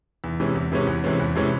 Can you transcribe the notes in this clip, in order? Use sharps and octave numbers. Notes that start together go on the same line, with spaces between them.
E2
C3 E3 G#3 C#4
E2
C3 E3 G#3 C#4
E2
C3 E3 G#3 C#4
E2
C3 E3 G#3 C#4